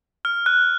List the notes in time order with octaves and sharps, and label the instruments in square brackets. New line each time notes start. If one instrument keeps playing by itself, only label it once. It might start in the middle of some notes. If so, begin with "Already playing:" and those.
[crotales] F6
F#6